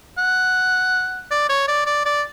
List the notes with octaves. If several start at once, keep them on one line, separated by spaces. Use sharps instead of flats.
F#5
D5
C#5
D5
D5
D5